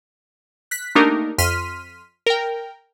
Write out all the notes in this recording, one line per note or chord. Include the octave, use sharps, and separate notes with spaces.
F#6 B6
A3 A#3 D4 D#4 G4 A#4
F2 C6 F6 B6 D#7
A#4 G5